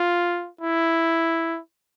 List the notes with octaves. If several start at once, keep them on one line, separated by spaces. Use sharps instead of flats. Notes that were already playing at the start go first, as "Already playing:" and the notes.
Already playing: F4
E4